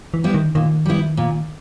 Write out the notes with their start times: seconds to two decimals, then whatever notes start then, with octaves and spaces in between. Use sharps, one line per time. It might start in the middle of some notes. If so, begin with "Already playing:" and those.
0.14 E3
0.24 G3 B3 E4
0.34 D#3
0.55 A#2 D#3
0.86 G3 B3 E4
1.17 A#2